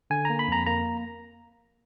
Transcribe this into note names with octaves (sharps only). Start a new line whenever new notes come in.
D3 G#5
A#3 A#5
B5
F2 A#5
A#3 A#5